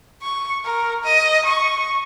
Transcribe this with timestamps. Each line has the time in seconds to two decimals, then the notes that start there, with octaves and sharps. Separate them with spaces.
0.22 C#6
0.65 A#4
1.04 D#5
1.46 C#6